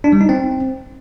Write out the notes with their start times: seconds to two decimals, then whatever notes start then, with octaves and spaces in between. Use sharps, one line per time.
0.04 D4
0.12 G3
0.21 D#4
0.29 C4